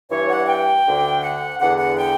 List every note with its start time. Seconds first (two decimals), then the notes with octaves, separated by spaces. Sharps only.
0.10 G2 E3 C#5
0.30 F#5
0.48 G5
0.86 D2 D3
1.23 F#5
1.60 E2 D3 F#5
1.79 F#5
1.98 G5